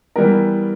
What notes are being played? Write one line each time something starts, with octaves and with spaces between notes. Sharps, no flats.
E3 G3 B3 A#4